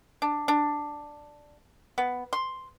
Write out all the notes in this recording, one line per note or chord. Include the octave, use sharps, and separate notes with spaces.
D4
D4
B3
C6